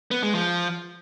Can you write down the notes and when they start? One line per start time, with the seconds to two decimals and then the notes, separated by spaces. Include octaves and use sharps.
0.11 B3
0.23 G#3
0.35 F3